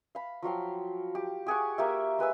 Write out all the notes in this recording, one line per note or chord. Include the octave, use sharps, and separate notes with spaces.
F5 B5
F3 F#3 F5 G5
G4
G4 G#4 F#5 C#6
A#3 G4 E5
G#3 B4 G#5 E6